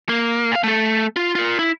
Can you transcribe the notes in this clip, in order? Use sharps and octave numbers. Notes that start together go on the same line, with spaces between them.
A#3
A#2 F5
A3 A4
F4
F4 A#4
E4